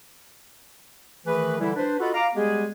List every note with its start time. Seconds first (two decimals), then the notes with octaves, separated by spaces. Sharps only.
1.25 D#3 E3 A3 G#4 B4
1.60 D3 E3 G3 E4
1.76 D4 B4 C5
2.00 F4 F#4 A4 D#5 F#5 B5
2.14 F5 A#5 D6
2.34 G3 G#3 B3 G4 G#4